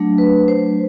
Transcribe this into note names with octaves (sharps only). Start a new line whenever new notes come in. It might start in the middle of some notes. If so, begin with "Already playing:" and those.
Already playing: F#3 A3 D4
B4
C5